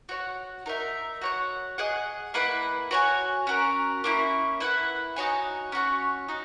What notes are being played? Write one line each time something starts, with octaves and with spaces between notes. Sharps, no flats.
F#4 C#5 F#5
D#4 A#4 E5
F#4 C#5 F#5
G#4 D#5 F#5
A#3 E4 B4 F#5
F#4 C#5 G#5
C#4 F#4 A#4
A#3 C#4 E4
E4 B4 F#5
D#4 F#4 C#5 G#5
C#4 F#4 C#5
D#4 F#4